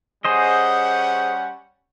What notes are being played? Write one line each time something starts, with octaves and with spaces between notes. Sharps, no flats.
G3 C#4 G#4 C5 D#5 F#5